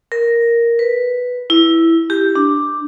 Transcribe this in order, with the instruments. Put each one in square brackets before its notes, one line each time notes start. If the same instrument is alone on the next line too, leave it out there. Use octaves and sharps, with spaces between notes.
[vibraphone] A#4
B4
E4
G4
D4